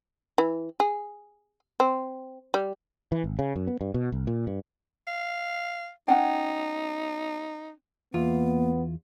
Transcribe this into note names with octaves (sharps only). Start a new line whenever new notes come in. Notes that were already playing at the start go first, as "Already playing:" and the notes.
E3
G#4
C4
G3
E3
G#1
C#3
F#2
B3
G2
B2
C2
A#2
G2
F5
C#4 D#4 F#5 G5
E2 A#3 B3 F4